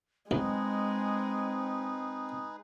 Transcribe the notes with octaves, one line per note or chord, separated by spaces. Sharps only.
A1 D2 F#3 G#3 C4 D#4 G#4 B4